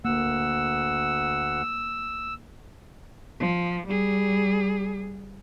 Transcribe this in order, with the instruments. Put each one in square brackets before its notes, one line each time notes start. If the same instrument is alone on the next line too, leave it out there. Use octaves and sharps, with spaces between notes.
[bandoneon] D2 F#5 [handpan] A#3 [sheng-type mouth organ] E6
[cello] F3
G3 G#4